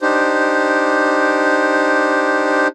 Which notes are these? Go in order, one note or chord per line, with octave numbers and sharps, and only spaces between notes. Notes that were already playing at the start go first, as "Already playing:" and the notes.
D4 D#4 G4 C5